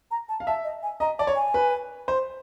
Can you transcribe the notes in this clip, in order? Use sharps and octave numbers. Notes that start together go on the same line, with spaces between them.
A#5
A5
F5
E5 A5
D#5
G#5
D#5 A#5
D5 A5
C#5
G#5
B4
C5